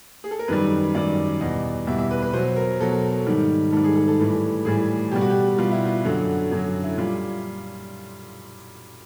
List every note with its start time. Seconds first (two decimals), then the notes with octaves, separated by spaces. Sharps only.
0.24 G#4
0.31 A4
0.39 A#4
0.48 F#2 D#3 G3 B4
0.95 F#2 D#3 G3 D5
1.41 E2 B2 G3 D#5
1.87 E2 B2 G3 E5
1.98 E5
2.11 B4
2.23 B4
2.33 B2 F#3 C5
2.56 A#4
2.81 B2 F#3 A4
3.26 G#2 D#3 G3
3.72 G#2 D#3 G3 A4
3.84 G#4
3.96 A4
4.08 A4
4.19 A2 E3 G3
4.65 A2 E3 G3 G#4
5.11 B2 G3 G4
5.21 F#4
5.30 G4
5.58 B2 G3 F4
5.72 E4
5.85 F4
6.05 F#2 D3 F#3 F#4
6.51 F#2 D3 F#3
6.83 E4
6.97 A#2 G3 F4